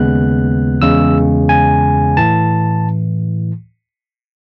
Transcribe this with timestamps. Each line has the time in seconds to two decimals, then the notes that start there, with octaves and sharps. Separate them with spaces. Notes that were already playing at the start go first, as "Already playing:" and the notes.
Already playing: D#2 C#3 G#3 B3 F#6
0.82 E2 C#3 G#3 E6
1.49 G#5
2.17 A2 E3 A5